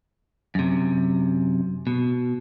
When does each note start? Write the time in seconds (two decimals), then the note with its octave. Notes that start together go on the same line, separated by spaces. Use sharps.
0.55 F#2 C3
1.87 B2